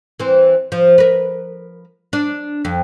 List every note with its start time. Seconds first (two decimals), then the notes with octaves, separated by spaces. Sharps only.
0.20 E3 C4
0.72 F3
0.98 A#4 B4
2.13 D4
2.65 F2